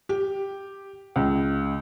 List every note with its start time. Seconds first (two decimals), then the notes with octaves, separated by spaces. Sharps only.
0.09 G4
1.16 C#2